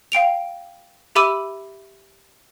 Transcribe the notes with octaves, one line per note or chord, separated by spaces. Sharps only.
F5 G5 D7 F7
G4 E5 B5 D6 E6 D#7